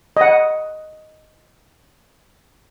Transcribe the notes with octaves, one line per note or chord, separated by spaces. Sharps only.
D#5 F#5